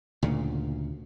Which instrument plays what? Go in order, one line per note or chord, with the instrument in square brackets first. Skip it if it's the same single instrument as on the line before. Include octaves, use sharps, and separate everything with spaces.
[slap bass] D2 A#2 C#3